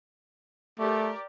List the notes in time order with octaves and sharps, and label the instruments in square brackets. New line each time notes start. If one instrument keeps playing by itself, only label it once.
[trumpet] A3 [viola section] G4 A#4 D5